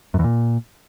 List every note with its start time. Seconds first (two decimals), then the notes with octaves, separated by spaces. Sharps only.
0.14 F#2
0.19 E2
0.24 A#2